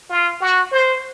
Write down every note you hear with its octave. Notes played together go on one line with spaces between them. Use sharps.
F4
F#4
C5